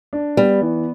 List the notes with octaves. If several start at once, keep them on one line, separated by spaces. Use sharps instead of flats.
D4
G3 B3
E3